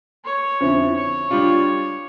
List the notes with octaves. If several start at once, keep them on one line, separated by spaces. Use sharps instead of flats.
C#5
F2 D3 F3 C#4 E4
C#5
G3 D4 F4